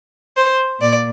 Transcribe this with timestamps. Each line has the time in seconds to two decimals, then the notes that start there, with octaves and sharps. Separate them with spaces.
0.36 C5
0.81 A#2 D5